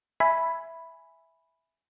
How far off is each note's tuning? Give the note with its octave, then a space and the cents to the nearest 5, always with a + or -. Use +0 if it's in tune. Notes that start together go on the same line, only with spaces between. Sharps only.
E5 +0 G#5 +0 B5 +0